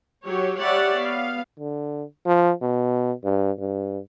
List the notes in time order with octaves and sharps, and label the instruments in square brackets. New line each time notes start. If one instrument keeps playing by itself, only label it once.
[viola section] F#3 G4 C#5
G3 G4 C#5 D5 E5 F#5
B3 F5
[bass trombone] D3
F3
B2
G2
G2